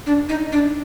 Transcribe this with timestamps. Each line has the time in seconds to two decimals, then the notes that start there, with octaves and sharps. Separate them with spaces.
0.06 D4
0.29 D#4
0.52 D4